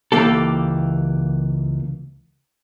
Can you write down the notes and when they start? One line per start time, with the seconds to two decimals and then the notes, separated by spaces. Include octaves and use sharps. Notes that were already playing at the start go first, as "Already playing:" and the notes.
0.12 C#2 E3 A#3 G4 A4